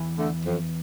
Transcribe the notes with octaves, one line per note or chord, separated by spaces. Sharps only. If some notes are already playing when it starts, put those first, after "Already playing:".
Already playing: E2 E3
D3 A3
F2